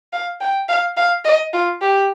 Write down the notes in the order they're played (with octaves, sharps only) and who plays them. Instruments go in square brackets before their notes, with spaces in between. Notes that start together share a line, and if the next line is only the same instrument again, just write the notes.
[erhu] F5
G5
F5
F5
D#5
F4
G4